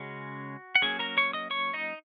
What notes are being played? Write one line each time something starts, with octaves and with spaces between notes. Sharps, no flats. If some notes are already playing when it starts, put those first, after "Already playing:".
Already playing: C#3 G#3 C#4 F#4
F#5
F#3 A#3 C#4 G#4 G#5
A#4 A#5
C#5 C#6
D#5 D#6
C#5 C#6
D#4 D#5